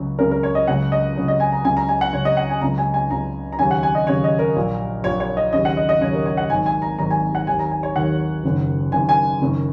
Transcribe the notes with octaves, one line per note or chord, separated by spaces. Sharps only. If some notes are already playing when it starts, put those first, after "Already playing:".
Already playing: C#2 C#3 F#3
C#2 C#3 F#3 A#4
A#4
C#5
D#5
C#2 C#3 F#3 F#5
D#5
C#2 C#3 F#3
D#5
G#5
A#5
C#2 C#3 F#3 G#5
A#5
G#5
F#5
C#2 C#3 F#3 C#5
D#5
F#5
G#5
C#2 C#3 F#3 A#5
G#5
G#5
C#2 C#3 F#3 A#5
A#5
D#2 C#3 F#3 G#5
F#5
G#5
D#5
D#2 C#3 F#3 C#5
D#5
A#4
A#1 A#2 F#3
A#1 A#2 F#3 C#5
C#5
D#5
D#2 C#3 F#3 D#5
F#5
D#5
D#5
D#2 C#3 F#3 C#5
A#4
C#5
F#5
G#1 G#2 D#3 F#3 G#5
G#5
A#5
G#1 G#2 D#3 F#3 A#5
G#5
F#5
D#2 D#3 F#3 G#5
A#5
G#5
C#5
D#2 D#3 F#3 F#5
F#1 F#2 D#3
F#1 F#2 D#3 G#5
G#5
F#1 F#2 D#3 F#3